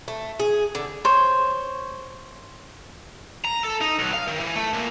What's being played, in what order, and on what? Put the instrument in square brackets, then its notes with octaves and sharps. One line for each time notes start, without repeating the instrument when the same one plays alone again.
[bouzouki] A3
G#4
D3
[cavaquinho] C5 C#5
[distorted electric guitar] A#5
A4
D#4
B1
F5
D#3
E3
A3
A#2